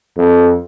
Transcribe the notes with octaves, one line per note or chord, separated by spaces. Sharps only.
F2